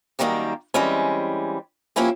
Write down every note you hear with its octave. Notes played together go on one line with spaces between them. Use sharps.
F#2 D#3 G3 A#3 G4
E3 G3 G#3 C4 C#4
F3 A#3 C#4 E4 G4